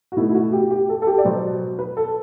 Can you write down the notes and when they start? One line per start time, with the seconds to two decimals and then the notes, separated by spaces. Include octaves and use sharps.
0.12 F#4
0.17 B2 A3 E4
0.29 E4
0.35 F#4
0.53 G4
0.71 G4
0.89 A4
1.02 A4
1.07 G4
1.18 D5
1.25 B2 F#3 B3 C5
1.79 B4
1.97 A4